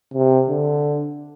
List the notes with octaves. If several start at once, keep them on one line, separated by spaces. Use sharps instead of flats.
C3
D3